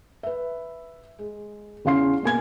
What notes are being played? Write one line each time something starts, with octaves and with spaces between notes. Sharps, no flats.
B4 E5
G#3
E2 C#3 C#4 F5 C6 C7
B2 A#3 G#5 G#6